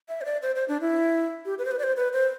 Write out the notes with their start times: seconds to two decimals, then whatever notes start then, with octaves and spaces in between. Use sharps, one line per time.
0.09 E5
0.21 C5
0.25 D5
0.42 C5
0.56 C5
0.68 D4
0.81 E4
1.46 G4
1.59 B4
1.65 C5
1.71 B4
1.79 D5
1.83 C5
1.97 B4
2.13 C5